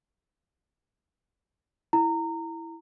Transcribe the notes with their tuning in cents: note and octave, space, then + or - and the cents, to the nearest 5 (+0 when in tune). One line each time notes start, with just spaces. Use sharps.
E4 +0 A#5 -20